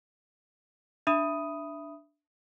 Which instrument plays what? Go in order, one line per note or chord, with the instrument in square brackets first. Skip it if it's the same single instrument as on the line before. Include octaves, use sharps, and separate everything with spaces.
[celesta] D4 E5 B5 D#6 D#7